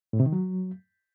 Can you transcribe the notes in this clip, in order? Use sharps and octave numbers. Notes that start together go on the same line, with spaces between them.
A2
C3
D#3
F#3